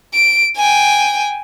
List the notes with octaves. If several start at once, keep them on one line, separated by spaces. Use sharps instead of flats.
D7
G5 G#5